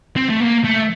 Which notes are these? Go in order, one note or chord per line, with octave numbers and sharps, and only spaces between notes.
C4
A3
A#3
A3